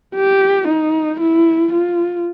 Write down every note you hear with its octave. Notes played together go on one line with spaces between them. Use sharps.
G4
D#4
E4
F4